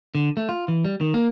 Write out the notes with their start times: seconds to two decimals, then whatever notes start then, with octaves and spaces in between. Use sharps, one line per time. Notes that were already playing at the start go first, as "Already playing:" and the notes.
0.15 D3
0.37 A3
0.49 F4
0.68 E3
0.85 G3
1.01 D#3
1.14 A#3